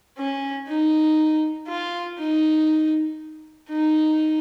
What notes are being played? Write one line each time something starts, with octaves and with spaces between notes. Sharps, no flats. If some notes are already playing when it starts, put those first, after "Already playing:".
C#4
D#4
F4
D#4
D#4